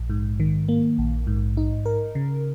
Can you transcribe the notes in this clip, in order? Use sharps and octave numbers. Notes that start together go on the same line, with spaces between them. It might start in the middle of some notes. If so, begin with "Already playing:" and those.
Already playing: A#1
G#2
D#3
A#3
A#1
G#2
D#4
A#4
C#3